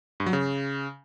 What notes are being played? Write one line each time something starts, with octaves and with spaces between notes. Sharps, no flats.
G2
F#3
C#3